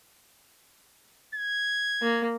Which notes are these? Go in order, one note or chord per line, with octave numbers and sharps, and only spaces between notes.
G#6
A#3